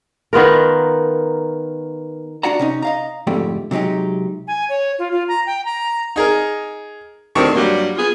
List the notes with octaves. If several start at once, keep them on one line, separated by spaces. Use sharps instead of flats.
D#3 B3 F4 A#4
D4 F#4 D5 F#5 A5 A#5
C3 C#4 D#4
D#5 F5 A#5
F2 G#2 D3 A3 G4
C3 F#3 G#3 D#4 G4
G#5
C#5
F4
F4
A#5
G5
A#5
D#4 G#4 A#4
D2 C3 D#3 C4 D4 C#6
G2 F#3 G3 A#3
B3 F4 G#4